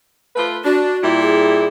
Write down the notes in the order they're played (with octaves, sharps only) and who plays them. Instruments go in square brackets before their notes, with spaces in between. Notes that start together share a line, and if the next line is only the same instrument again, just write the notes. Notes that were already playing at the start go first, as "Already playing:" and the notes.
[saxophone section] A3 F4 B4
[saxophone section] D4 [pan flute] F#4
[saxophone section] A#2 G3 E4
[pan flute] G#4